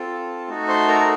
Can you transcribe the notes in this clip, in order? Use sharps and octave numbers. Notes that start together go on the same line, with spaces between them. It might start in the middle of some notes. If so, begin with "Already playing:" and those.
Already playing: C4 F4 A4 A5
A3 D#4 F#4 A4
C5 C6
A#4 A#5